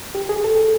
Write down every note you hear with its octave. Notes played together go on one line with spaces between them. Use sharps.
G4
G#4
A4